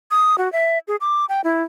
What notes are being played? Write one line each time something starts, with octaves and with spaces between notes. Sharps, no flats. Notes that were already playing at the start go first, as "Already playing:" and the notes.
D#6
F#4
E5
G#4
D6
G5
E4